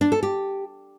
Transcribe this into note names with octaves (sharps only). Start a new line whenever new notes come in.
D4
A4
G4